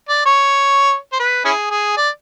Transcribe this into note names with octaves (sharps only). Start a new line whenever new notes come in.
D5
C#5
C5
B4
C#4 E4 G#4
G#4
D5